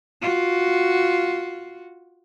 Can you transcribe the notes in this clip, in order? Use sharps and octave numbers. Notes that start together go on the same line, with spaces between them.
F4 F#4